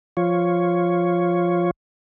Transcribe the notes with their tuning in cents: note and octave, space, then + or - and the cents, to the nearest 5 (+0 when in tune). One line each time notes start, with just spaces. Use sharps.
F3 +0 F4 +0 C#5 +0